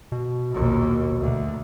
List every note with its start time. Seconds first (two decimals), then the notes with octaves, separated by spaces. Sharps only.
0.12 B2
0.50 A#1 D#2
1.20 D2